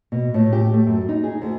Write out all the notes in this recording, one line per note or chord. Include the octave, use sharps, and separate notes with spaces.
B2
A2
G4
A3
F#2
D#4
G#4
D2